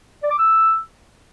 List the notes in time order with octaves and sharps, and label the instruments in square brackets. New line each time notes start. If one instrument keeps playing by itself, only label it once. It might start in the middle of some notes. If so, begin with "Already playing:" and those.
[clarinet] D5
D6
E6